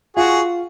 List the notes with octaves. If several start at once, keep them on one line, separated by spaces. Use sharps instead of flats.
F4 F#4 G#4